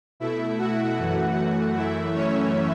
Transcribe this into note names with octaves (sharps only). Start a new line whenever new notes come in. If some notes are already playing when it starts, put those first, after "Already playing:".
B2 A3 E4 E5
F#4 F#5
F#2 E3 A3
F#2 E3 A3 E4 E5
C#4 C#5